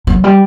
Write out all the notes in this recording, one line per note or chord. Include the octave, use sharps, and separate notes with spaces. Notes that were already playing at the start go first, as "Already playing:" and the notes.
F#3
G3